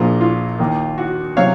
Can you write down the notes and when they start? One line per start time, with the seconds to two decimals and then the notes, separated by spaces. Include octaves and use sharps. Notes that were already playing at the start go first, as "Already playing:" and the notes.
Already playing: A#1 A#2 F3 A#3 F4 G#4
0.21 F4
0.59 D#2 D#3 A#3
0.98 F#4
1.37 C3 F#3 C4 C#5 F5